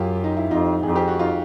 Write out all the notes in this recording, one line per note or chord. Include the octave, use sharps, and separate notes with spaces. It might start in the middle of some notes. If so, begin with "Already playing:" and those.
Already playing: F#2 F4 G4
D#4
E4
F2 D#4 F4
F2 G#4
G4
F#4
D#4 F4